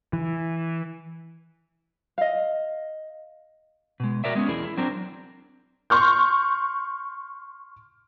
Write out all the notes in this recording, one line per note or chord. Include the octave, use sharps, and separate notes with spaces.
E3
D#5 F5
B2 G#3
F#4 A#4 D5 E5
G#3 B3 C#4
E2 E4 G#4 A#4
E4
F#3 C4 D4 A#4
C6 C#6 F6 G6